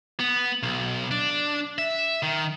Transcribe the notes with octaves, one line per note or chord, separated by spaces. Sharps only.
B3
B1
D4
E5
D#3